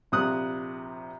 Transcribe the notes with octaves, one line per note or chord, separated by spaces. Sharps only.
A#1 C3 D#6 F#6